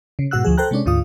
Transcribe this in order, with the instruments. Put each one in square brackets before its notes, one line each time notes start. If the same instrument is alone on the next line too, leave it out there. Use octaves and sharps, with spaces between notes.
[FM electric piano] C#3
G#2 B2 F#4 F#5 E6 F#6
D2 F3 G#4
A4 C5 G5 A#5 F#6
C3 G#3 C#4 D4
D2 G#2 D3 F4 F5 D#6